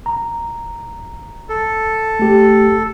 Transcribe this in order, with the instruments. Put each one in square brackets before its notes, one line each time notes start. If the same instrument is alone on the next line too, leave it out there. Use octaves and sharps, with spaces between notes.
[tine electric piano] A#5
[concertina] A4
[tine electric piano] A3 G4